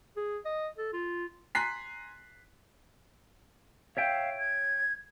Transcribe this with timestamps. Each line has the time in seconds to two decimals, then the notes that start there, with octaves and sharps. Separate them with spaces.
0.16 G#4
0.45 D#5
0.78 A4
0.93 F4
1.55 G#5 A#5 C6 F#6 B6 C7
3.97 C#5 E5 F5 G5
4.39 G#6